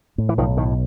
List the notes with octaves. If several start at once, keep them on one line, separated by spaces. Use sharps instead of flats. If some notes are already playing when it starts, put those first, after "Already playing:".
A2
E3
B1 D#3 F3
A2 D#3